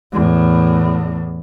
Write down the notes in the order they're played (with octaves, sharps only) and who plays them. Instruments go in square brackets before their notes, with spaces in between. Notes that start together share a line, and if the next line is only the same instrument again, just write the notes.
[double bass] E2 A2